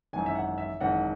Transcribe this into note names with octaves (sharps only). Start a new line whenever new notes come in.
G#1 F#2 E3 G#5
E5
F#5
E5
G#1 F#2 E3 F#5